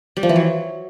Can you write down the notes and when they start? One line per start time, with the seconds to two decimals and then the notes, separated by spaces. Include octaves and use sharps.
0.17 G3
0.23 F3
0.29 E3
0.36 F#3